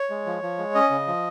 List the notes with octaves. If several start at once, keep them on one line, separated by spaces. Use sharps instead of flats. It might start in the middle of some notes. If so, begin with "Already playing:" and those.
Already playing: C#5
G#3
F3
F3
G#3
C#4 D#5
C#3
F3